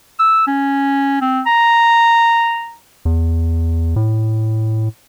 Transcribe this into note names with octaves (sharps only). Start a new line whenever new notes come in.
E6
C#4
C4
A#5
E2
A2